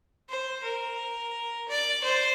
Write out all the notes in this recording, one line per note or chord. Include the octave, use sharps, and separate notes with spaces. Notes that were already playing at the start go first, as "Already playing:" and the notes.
C5
A#4
D5
C5